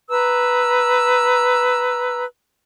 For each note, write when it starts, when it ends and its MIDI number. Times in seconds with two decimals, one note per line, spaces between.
0.09 2.23 71
0.09 2.23 82
0.09 2.23 88